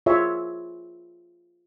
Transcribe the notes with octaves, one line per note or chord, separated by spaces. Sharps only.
F4 G#4 C#5 E5